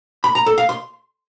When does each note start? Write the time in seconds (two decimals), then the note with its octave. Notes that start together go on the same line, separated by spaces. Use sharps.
0.24 B5
0.35 A#5
0.46 A4
0.58 F5
0.69 C6